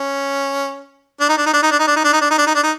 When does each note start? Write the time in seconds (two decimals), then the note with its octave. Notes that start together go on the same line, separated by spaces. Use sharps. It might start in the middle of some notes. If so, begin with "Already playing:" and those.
Already playing: C#4
1.21 D4
1.29 D#4
1.38 D4
1.46 D#4
1.54 D4
1.63 D#4
1.71 D4
1.80 D#4
1.87 D4
1.96 D#4
2.04 D4
2.13 D#4
2.22 D4
2.30 D#4
2.38 D4
2.47 D#4
2.55 D4
2.63 D#4